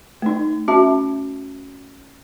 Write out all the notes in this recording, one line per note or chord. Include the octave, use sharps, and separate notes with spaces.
A3 D#4
C#4 F#4 E5 A5